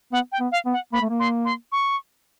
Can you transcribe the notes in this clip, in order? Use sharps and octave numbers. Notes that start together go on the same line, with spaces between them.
B3 F#5
G5
B3
F5
B3
F#5
A#3 B5
A3
A#3
C6
C6
C#6